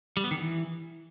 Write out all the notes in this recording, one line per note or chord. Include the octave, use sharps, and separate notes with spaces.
G3
B3
D#3
E3